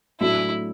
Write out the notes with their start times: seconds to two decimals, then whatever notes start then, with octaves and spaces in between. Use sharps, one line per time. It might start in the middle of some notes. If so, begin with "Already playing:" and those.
0.20 A2 F#3 A3 D4 E4 F#4